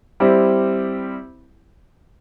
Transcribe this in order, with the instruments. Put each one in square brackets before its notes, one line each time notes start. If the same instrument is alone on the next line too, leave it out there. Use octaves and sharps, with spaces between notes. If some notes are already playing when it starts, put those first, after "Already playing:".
[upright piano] G3 C4 E4 G4